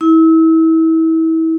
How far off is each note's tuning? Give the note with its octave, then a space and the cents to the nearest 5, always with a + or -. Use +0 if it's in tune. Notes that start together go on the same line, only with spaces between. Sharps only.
E4 -30